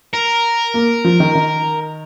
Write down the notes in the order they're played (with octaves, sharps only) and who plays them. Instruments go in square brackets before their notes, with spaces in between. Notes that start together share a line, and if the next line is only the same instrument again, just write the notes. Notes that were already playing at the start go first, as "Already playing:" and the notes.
[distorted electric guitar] A#4
[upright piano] A#3
F3
D#3
D#3